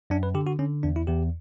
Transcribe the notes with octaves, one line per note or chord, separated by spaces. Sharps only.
F#2 D4
B4
D3 G4
F#4
D3 C#4
E2 D4
E4
E2 G4